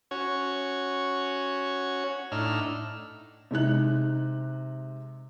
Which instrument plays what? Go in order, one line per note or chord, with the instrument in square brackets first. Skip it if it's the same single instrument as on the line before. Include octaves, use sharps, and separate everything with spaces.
[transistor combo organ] C#4 F#4 C#5
A2 D4 D#4 E6 F6
[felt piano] C3 G#3 D#4 F#6